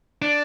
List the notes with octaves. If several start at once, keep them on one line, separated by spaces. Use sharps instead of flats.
D4